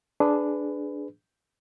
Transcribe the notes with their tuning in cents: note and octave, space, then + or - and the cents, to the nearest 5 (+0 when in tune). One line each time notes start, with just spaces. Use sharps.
D4 +0 G#4 +15 B4 +20